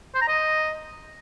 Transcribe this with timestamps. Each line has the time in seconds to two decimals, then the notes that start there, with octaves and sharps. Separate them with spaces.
0.15 C5
0.22 A#5
0.28 D#5